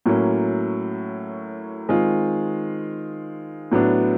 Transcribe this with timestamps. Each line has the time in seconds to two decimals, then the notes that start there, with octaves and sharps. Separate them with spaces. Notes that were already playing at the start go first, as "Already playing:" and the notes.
0.06 A2 F#3 A#3 C#4
1.89 D#3 G#3 C4 F4
3.72 A2 F#3 B3 D4